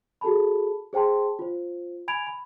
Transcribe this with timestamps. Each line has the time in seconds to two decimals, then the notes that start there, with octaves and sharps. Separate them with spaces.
0.21 F#4 G#4 A4 A5 B5
0.93 G#4 C5 G5 A5 C6
1.39 F4 C5
2.08 G#5 B5 G#6 D7 F7
2.27 B5